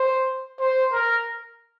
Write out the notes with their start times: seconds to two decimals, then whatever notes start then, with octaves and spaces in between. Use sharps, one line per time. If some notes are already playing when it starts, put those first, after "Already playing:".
Already playing: C5
0.60 C5
0.93 A#4